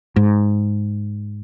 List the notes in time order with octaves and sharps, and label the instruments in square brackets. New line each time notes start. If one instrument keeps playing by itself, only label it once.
[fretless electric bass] G#2